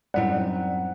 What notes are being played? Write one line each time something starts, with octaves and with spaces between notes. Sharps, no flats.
F#2 A2 G3 C4 D#4 F#5